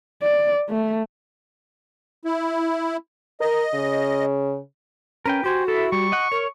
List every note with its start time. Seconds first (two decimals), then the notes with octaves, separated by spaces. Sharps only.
0.23 D5
0.69 A3
2.25 E4
3.40 A#4 D#5
3.74 C#3
5.26 C#4 A#4 B4 G5
5.44 F#4 G4 C5 G#5
5.68 E4 A4 E5
5.92 G3 C#6
6.12 D#5 F#5
6.32 A#4 C#5